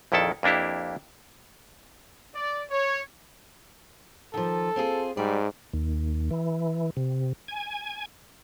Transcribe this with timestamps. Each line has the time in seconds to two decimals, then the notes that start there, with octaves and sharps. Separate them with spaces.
0.12 A#1 F2 D#3 E4 A4 A5
0.43 F2 A#3 D4 E4 G4
2.35 D5
2.71 C#5
4.34 D#3 F3 A4
4.76 C4 F4 G#4
5.17 G#2 G3 D5
5.73 D#2
6.31 E3
6.97 C3
7.48 G#5